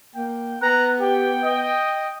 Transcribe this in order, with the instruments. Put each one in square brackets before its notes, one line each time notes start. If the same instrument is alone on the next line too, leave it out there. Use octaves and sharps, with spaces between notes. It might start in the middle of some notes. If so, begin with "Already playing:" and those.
[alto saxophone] A#3 [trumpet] G5
[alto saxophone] B3 [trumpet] A#5 [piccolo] F#6
[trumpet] G4 [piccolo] G5
[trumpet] D#5